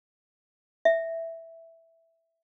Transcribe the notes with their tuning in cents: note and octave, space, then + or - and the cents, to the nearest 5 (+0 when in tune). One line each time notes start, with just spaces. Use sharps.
E5 +0